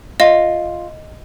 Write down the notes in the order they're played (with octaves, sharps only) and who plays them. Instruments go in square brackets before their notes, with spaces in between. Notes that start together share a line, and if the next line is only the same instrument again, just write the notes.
[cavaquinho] F4 [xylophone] D#5